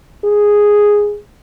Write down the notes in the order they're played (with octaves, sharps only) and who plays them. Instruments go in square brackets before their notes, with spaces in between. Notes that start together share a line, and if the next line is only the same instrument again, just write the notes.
[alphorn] G#4